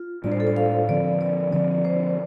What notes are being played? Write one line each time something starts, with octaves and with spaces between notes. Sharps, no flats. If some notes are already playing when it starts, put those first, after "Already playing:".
Already playing: F4
A2 G3 D4 D5
C5
A4
C5
F5
D3 F3 C4 D5
D5
D3 F3 C4 D5
C5